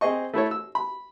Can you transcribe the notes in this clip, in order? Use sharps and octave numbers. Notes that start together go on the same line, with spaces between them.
C4 G#4 C5 D#5 C#6
A3 E4 A4 C#5
E6
B5